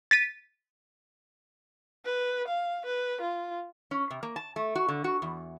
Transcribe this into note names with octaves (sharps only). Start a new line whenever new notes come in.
A6 B6 D#7
B4
F5
B4
F4
C#4
C3
A#3
A5
A3
F#4
D3
F#4
E2